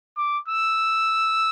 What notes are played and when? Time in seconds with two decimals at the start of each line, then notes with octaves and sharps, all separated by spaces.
0.17 D6
0.48 E6